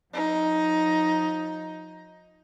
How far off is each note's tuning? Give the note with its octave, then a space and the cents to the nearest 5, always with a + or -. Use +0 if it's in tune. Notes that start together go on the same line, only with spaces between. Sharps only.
F3 +40 D#4 +10